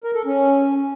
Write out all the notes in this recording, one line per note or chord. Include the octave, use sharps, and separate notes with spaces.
A#4
A4
C#4